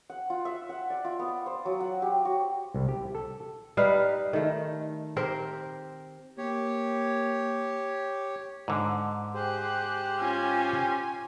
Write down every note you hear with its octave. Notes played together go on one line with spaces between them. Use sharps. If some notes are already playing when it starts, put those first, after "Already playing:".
F#5
F4
E5
F#5
D5
F4
B3
C5
F#3
F#5
G4
F#4
C2
G4
A4
G3 D#4 B4 F5
D#3 A3
C4 G4 A#4 C5
A#3 G4 C#5
G#2 D3
G4 G#4 C5 F#6
C#4 F4 G#5